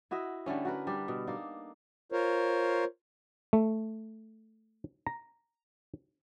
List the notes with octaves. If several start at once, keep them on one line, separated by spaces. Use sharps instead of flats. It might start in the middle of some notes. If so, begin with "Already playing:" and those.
E4 F#4 D#5 E5
D3 G3 A3 C#4
F#4 A#4 B4
G3 D4 G4
B2
A#3 D4 D#4 A4
F4 A#4 C5 C#5
A3
A#5